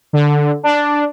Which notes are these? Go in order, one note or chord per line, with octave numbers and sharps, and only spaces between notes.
D3
D4